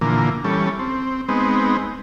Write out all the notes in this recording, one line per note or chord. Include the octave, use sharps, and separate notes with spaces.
A#2 D3 E3 F3 A#3
E3 G3 C#4 A4
C4
G#3 B3 C4 D#4